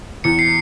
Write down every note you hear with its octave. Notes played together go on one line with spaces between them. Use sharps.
E2 C#7
C7